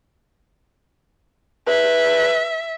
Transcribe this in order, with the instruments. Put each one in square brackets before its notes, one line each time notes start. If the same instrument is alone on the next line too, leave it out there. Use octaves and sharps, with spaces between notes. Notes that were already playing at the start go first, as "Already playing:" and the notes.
[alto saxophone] B4 [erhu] E5